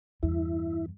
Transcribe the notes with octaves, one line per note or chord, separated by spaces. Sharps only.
E2 G2 E4